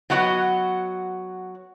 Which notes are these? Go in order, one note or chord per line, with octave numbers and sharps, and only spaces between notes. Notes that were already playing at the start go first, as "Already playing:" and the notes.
F#3 B3 F#4 D#5 F#5